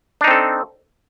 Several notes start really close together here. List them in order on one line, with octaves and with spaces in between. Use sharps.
D4 D#4 C4 A4